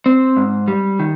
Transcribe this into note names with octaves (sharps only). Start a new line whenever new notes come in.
C4
G#2
G3
D#3